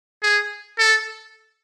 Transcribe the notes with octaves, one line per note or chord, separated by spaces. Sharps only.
G#4
A4